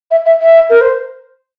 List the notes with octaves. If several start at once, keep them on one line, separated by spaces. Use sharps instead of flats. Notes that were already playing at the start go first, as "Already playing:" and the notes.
E5
E5
E5
A#4
C5